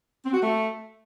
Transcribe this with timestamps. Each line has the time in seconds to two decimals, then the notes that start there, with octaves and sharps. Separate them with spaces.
0.24 C4
0.33 F#4
0.42 A3